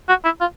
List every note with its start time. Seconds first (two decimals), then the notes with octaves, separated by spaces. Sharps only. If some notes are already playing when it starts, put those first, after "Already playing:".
0.09 F#4
0.24 E4
0.41 F4